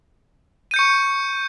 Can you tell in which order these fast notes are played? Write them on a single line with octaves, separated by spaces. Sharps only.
D#7 G6 C#7 C#6